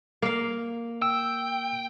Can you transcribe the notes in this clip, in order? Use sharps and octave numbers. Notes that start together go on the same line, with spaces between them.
A#3 F5
G5 E6